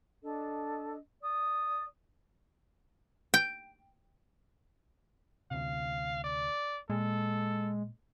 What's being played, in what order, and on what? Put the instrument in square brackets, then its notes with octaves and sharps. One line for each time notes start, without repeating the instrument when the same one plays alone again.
[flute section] D4 A4 D#5
D5 D#6
[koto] G5
[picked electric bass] D2 C3 [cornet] F5
[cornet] D5
[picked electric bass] A#2 [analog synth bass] G#3 [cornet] A4